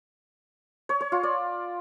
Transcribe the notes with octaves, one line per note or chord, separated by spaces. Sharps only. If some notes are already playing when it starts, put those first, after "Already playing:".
C#5
C#5
F4
D5